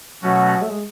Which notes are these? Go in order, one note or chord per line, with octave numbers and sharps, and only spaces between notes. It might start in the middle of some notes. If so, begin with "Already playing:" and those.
B2 F#3 A3 C#4 F#4
A3
G#3